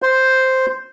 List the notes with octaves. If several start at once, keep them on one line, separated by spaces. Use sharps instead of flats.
C5